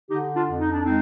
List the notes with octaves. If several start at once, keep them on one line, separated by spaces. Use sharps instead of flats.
D3 D#4 G4
D4 F4
F2
D#4
D4
G#3 C4 D#4